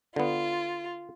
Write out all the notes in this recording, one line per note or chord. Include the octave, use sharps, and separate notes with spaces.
D3 B3 F4